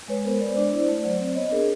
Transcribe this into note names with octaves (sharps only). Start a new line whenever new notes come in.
G#3 B4 C#5
B3 A#4 C5
G#3 C5 D5
D4 C5 D5
E4
A3
F#3
C4
B3 C#5 D#5
D4 G#4 A#4